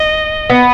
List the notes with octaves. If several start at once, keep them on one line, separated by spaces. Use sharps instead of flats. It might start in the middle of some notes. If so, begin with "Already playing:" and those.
Already playing: D#5
B3